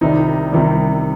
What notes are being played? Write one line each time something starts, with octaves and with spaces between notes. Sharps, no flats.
C2 C3 D#3 G3 D#4
C2 C3 D#3 G3